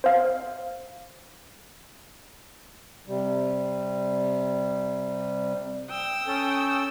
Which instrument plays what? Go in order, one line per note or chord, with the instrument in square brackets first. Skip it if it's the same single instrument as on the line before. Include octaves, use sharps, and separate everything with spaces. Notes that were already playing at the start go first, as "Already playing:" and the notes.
[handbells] C5 F5
[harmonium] C3 G3
[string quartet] G5 D#6 E6
[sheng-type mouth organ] C#4 A4